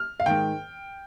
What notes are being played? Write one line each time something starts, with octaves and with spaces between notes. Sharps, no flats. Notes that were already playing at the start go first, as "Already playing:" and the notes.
Already playing: F6
F5
G#2 D#3 G5